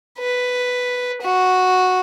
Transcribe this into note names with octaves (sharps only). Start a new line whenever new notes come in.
B4
F#4